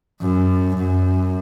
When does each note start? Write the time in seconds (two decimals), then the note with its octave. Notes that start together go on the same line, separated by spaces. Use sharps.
0.22 F#2
0.77 F#2